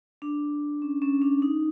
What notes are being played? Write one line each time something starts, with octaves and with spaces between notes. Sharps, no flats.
D4
C#4
C#4
D4
D#4